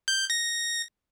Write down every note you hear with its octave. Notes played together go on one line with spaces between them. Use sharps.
G6
A#6